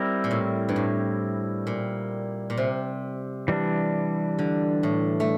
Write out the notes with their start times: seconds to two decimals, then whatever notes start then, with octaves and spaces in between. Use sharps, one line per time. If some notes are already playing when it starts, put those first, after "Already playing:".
Already playing: G3 C4 E4 A#4
0.24 A#2
0.31 A2
0.69 G2
0.76 A2
1.67 A#2
2.50 A#2
2.57 C3
3.48 E3 G3 D4
4.39 D3
4.83 A2
5.20 A3